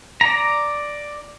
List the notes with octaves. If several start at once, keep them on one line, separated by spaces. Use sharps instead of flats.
D5 A#5